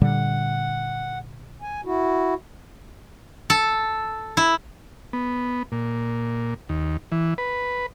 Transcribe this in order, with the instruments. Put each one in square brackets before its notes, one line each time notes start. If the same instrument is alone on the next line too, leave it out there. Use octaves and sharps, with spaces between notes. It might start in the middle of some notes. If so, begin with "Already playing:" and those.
[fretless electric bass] A#2 D3 G3 [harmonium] F#5
[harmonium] G#5
E4 F#4
[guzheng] A4
E4
[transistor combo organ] B3
A#2
D#2
E3
B4